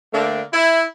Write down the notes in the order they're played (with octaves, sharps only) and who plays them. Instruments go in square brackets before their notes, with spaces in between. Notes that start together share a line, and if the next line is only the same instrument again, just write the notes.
[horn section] D3 A3 A#3 C4 D4
E4